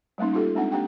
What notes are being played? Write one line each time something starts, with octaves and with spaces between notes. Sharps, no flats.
G3 A3 A#3 C#4 D#4
D#4 F4 G4 A4
G#3 C4 D4 D#4 F#5
A#3 D4 G4 F#5 G5